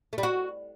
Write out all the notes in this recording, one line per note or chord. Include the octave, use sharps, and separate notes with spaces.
A3
G3
F#4